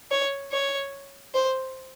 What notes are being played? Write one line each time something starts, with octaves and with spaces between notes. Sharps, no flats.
C#5
C#5
C5